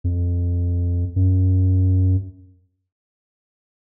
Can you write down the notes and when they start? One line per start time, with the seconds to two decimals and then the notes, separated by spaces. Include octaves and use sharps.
0.04 F2
1.16 F#2